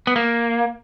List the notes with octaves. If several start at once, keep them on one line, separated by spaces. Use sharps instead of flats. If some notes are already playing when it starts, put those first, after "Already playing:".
B3
A#3